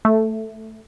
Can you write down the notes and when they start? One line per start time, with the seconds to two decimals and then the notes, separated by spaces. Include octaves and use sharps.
0.05 A3